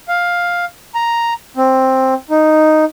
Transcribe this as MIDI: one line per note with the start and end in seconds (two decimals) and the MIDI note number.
0.08 0.65 77
0.95 1.34 82
1.57 2.14 60
2.30 2.85 63